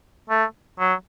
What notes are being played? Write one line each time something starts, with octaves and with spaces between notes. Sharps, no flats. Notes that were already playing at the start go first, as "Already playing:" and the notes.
A3
F#3